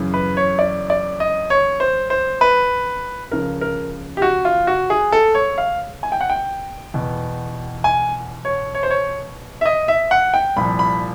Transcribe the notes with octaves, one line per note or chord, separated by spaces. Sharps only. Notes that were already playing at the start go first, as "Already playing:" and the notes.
Already playing: F#2 C#3 E3
B4
C#5
D5
D5
D#5
C#5
C5
C5
B4
C#2 C#3 F3 A#4
A#4
G4
F#4
F4
F#4
G#4
A4
C#5
F5
G#5
G5
F#5
G5
E2 B2
G#5
C#5
C#5
C5
C#5
E5
D#5
E5
F#5
G5
C2 A#2 F3 B5
B5